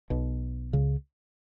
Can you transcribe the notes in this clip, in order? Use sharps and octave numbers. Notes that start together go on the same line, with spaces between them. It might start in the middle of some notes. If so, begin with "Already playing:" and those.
B1 B2
C#2 C#3